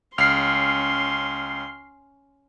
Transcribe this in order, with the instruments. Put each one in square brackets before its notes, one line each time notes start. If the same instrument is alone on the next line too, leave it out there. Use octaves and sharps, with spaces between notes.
[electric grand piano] C#2 [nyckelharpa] C#4 C6 [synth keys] F6 C7